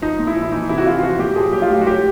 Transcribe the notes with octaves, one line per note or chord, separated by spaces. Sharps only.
F3 D#4
A#2
E4
F3
E4
E3 D#4
C3 E4
F#4
E3 F4
F4
F3 F#4
A#2 G4
F3 G#4
F#3 G4
F4
A2 F#4
F#4
F#3 G4